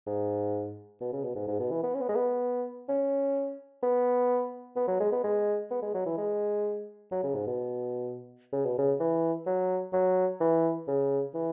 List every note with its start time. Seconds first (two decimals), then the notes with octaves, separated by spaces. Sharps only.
0.07 G#2
1.01 B2
1.13 C#3
1.24 B2
1.36 G#2
1.48 G#2
1.60 B2
1.71 E3
1.83 B3
1.95 C#4
2.01 B3
2.09 G#3
2.16 B3
2.89 C#4
3.83 B3
4.76 B3
4.88 F#3
5.00 G#3
5.12 B3
5.24 G#3
5.71 B3
5.83 G#3
5.94 F#3
6.06 E3
6.18 G#3
7.12 F#3
7.24 C#3
7.35 G#2
7.47 B2
8.53 C#3
8.66 B2
8.78 C#3
9.00 E3
9.47 F#3
9.93 F#3
10.41 E3
10.88 C#3
11.35 E3